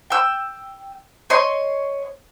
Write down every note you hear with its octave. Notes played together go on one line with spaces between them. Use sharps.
G5 E6
C#5 D#5 C6